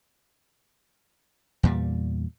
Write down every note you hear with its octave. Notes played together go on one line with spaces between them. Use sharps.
E2 A#2 G3